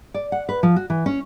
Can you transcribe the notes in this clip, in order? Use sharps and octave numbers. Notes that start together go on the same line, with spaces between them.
D5
F#5
B4
F3
F#4
E3
C#4